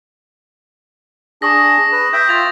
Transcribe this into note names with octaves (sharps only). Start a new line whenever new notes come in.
D4 G#4 C#6 D#6 A#6
B4
E5 G5 G6
F4 A6 F7